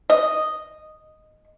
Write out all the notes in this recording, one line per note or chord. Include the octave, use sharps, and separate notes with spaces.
D#5